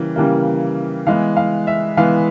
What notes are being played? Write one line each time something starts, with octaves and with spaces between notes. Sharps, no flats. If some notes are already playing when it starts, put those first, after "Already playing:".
Already playing: C#3 E3 G3 A#3
C#3 E3 G3 A#3
E3 G#3 B3 F5
F5
E5
E3 G#3 B3 F5